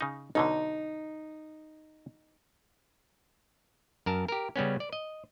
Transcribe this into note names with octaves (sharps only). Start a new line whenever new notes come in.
C#3 D#4
B1 B2 D3 D#4
F#2 A#4 A5
G4 A#4
C#3 G3 B3 C#4
D5
D#5